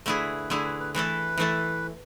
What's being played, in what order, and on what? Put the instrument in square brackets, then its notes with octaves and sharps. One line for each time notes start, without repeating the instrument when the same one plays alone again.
[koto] D3 A3 E4 G#4 [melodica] B4
[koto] D3 A3 E4 G#4 [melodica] A4
[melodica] B4
B4
[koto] E3 A3 E4 A4 [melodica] B4
[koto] E3 A3 E4 A4